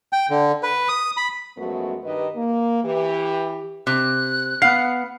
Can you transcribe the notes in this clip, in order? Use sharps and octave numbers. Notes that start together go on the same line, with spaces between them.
G5
D3
B4
D#6
B5
F#2 F3 G#3 A3 B3 F#4
G2 D#3 D#4 G4 B4 D#5
A#3
E3 G4
C3 F#6
B3 F5 F#5 C7